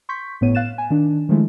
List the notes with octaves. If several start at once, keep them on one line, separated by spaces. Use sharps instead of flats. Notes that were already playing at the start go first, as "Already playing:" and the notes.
C6 C#6 G6 B6
G1 A2 B3 C#5 D#7
F5 F#6 A6 E7
G#5
D#3 D4
D#3 F3 G#3 A3 E4